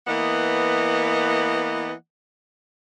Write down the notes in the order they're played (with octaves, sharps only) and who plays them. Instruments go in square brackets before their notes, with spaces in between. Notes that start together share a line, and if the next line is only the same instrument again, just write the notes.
[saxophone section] E3 A#3 B3 D#5 F#5